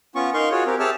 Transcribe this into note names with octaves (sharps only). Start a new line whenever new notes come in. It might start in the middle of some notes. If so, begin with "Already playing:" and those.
B3 C#4 F4 C#6
D#4 A#4 F5 C6 C#6
F4 F#4 G#4 C#5
C4 G4 A#4
G4 G#4 C#5 E5 A5 F6